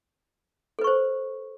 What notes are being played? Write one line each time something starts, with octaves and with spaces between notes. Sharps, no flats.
A4 B4 C5 C#6